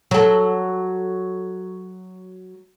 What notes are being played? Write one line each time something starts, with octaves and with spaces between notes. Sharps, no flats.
F#3 A4